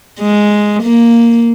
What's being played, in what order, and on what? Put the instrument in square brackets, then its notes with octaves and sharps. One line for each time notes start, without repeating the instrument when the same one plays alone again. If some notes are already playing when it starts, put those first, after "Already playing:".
[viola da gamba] G#3
A#3